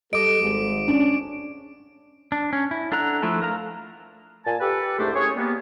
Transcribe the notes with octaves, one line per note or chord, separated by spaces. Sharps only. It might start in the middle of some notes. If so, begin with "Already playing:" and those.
G3 A4 D#5 D6 D7
G#1 G#2
C#4 D4
D4
C#4
E4
D4 A4 F#5 A#5 F#6
F3 A3 E4 A4
A#4 F5 A#5
A#2 G#5 A5
G4 A4 B4
C2 G#2 A3 D4 G4 C5
C#4 G#4 C#5
G3 A#3 B3